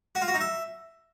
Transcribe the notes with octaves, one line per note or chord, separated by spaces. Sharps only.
F#4
F4
F#4
D#4
E5